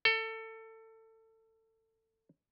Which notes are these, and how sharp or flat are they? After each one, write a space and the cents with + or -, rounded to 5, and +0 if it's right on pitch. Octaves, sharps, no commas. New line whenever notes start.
A4 +25